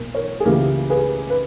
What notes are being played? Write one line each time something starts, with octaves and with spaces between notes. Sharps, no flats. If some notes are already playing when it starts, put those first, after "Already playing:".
Already playing: B1 A#2 A#4
A#4 C#5
G#4
C#2 C#3 E3 A#3 G4 A#4
G#4 B4
B4